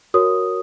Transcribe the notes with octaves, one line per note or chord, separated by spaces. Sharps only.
F#4 A#4 C#5 D#6